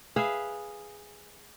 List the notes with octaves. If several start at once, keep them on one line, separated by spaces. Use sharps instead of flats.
G#4 B4 E5 F5